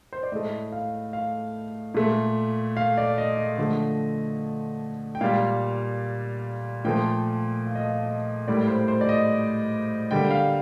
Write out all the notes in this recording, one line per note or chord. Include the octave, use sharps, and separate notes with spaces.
C5
D5
A2 A3 D#5
F5
F5
A#2 A3
F5
D5
D#5
D#5
D3 F3 A3
G5
A#2 G3 A#3 F5
A#2 F3 A3 G5
F5
D#5
F5
D#5
A2 G3 A#3 D5
C5
C5
D5
D#5
D3 G3 A#3 G5
F5